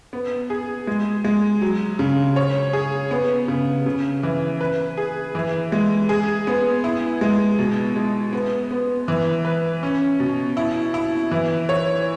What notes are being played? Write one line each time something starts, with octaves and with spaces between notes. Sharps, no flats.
B3
G#4
G#3
G#3
F#3
C#3
C#5
G#4
B3
C#3
C#3
E3
B4
G#4
E3
G#3
G#4
B3
E4
G#3
B2
G#3
B3
B3
E3
B4
C#4
B2
E4
E4
E3
C#5